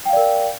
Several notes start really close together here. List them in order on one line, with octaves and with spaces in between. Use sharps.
G5 F5 D5 A#4